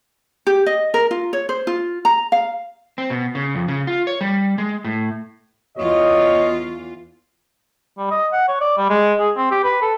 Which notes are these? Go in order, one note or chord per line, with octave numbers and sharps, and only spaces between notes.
G4
D#5
A#4
F4
C#5
C5
F4
A#5
F5
C4
B2
C#3
F2
C#3
F4
C#5
G3
G#3
A2
E2 F4 F#4 C#5 D#5
G3
D#5
F#5
C#5
D5
G3
G#3
G#4
C4
G4
B4
A4